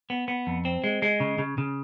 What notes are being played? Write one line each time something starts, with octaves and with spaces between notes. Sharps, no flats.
B3
B3
F2
C4
G#3
G#3
C#3
C#3
C#3